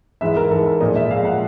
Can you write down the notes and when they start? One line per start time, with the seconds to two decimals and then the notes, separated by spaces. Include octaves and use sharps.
0.21 G#2 E3 G#3 E5
0.36 A#4
0.51 G#2 E3 G#3 A4
0.66 A#4
0.81 A#2 F3 G#3 D#5
0.96 E5
1.10 A#2 F3 G#3 F5
1.25 F#5